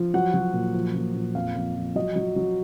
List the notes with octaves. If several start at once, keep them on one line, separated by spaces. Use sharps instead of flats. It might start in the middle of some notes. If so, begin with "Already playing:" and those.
Already playing: F3
F#3 F#5
F#3
A#2
F3
A#2
A#2
F2 F5
F2
F3
F#3 D#5
F#3
F#3